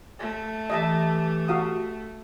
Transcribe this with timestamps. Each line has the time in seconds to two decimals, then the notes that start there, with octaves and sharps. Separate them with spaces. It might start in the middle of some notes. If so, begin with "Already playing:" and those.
0.19 A3
0.70 E3 G4 D#5 E5 A5
1.48 F#4 F5 D#6